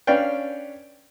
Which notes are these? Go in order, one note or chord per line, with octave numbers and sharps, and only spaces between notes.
C#4 D4 B4 D5 F5 G5